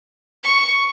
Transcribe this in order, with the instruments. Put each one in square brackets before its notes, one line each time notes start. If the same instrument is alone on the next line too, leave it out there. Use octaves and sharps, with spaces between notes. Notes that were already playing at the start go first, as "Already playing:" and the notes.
[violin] C#6